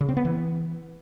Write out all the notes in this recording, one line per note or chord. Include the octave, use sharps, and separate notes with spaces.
C#3
C4
B3
E3